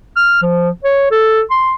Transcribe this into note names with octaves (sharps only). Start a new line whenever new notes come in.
F6
F3
C#5
A4
C6